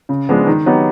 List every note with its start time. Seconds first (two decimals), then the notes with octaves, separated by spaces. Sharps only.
0.09 C#3
0.29 F3 G#3 B3 D4
0.47 D#3
0.66 F#3 B3 D#4 G4